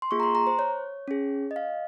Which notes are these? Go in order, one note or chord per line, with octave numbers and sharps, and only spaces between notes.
C6
A#3 F4 G#4 C#6
A#5
C6
A#5
C5
C#5
C#4 G#4
D#5
F5